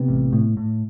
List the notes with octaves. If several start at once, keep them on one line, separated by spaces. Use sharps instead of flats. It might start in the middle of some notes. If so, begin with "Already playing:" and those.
Already playing: C3 B3
A1
A2
A2